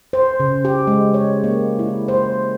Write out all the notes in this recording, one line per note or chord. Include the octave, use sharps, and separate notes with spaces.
C5
C#3
G4
G#3
C#5
A#3
E4
C5